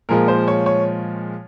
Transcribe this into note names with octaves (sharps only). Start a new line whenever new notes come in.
A#2 F3 G#3 A#4
C5
C#5
C#5